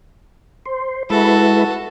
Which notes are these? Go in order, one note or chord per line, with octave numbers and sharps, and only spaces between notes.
C5
G#3 E4 F#4 A4 B4